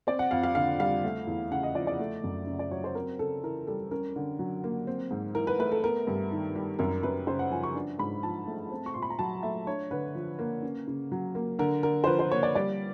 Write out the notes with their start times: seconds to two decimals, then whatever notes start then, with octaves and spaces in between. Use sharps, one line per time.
0.07 C4 D5
0.19 F#5
0.31 F2 F5
0.43 F5
0.55 D3 F5
0.80 G3 F5
1.04 A3
1.27 E2
1.51 C#3 F#5
1.63 D#5
1.75 F3 D5
1.87 D5
1.99 A3
2.24 F#2
2.47 C#3
2.59 D5
2.71 F#3 C#5
2.84 C5
2.95 C4 A#4
3.19 C#3 A4
3.43 E3 A#4
3.67 G3 A4
3.91 C#4 A#4
4.16 D3
4.39 F#3
4.64 A#3
4.87 C4
5.11 G#2
5.35 E3 A#4
5.47 B4
5.59 A3 B4
5.72 A4
5.83 B3 A#4
6.07 G2
6.32 D#3
6.55 G3
6.79 F#2 A#4
7.03 F#2 B4
7.27 C#3 C5
7.39 F#5
7.51 F3 G#5
7.63 C#6
7.75 D4
7.99 G#2 B5
8.23 F3 A5
8.47 A3
8.72 C4
8.86 C#6
8.94 A#2 C6
9.02 B5
9.10 A#5
9.19 F#3 A5
9.43 A3 E5
9.67 D4 C#5
9.91 D3 B4
10.15 F3
10.39 A#3
10.63 C#4
10.87 C#3
11.12 F#3
11.35 A#3
11.59 D3 A#4
11.83 D3 A#4
12.04 C5
12.07 F3 B4
12.19 C5
12.31 A#3 C#5
12.43 D5
12.55 G3 D5